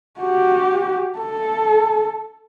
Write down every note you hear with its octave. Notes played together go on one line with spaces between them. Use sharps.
F#4 G4
A4